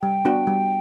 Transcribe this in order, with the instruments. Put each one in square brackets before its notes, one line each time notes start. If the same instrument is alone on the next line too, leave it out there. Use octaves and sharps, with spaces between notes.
[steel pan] G3 [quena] G5
[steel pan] B3 D4 F#4
G3